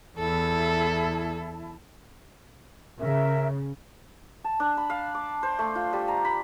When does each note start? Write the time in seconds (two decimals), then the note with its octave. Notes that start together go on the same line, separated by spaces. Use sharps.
0.18 E2 E4 A4 A5
3.00 C#3 A#4 E5
4.44 A5
4.60 D4
4.77 B5
4.90 F5
5.15 D6
5.43 C5
5.59 A3
5.75 F4
5.93 G3
6.08 A#5
6.25 B5